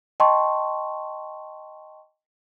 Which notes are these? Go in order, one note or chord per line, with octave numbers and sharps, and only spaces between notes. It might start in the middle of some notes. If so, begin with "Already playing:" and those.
D#5 G5 A5 C6 C#6